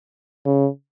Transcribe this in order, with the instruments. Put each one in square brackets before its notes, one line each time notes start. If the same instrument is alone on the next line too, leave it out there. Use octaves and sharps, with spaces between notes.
[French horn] C#3